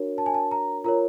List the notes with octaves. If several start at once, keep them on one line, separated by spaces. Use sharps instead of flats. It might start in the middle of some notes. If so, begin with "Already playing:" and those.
Already playing: D4 F#4 A#4 C#5
A5
G#5
A5
A#5
F4 A#4 C#5 A#5